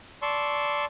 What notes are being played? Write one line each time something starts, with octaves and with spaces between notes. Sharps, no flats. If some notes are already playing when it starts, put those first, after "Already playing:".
D5 A5 C6 C#6 E6